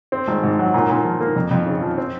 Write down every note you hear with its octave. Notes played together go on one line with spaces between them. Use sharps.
C4
G#1
G#2
F#3
A#2
A#2
F3
A#3
F2
F2
C#3
F3
C4